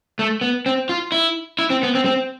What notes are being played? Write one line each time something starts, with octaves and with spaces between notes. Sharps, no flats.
A3
B3
C4
F4
E4
E4
C4
B3
C4
C4